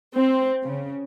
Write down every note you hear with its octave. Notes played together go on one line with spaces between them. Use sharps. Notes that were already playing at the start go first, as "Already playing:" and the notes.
C4
C#3